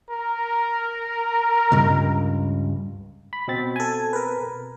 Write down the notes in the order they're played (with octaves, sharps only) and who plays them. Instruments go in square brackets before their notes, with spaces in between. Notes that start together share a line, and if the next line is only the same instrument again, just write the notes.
[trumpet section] A#4
[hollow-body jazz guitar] C#2 G2
[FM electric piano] B5
[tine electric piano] B2 C4 A6
[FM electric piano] A4 G#5
A#4 B4